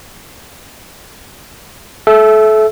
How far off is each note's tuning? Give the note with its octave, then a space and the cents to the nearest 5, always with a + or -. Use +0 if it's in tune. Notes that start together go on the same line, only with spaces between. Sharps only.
A4 -30 E5 +0 E6 +0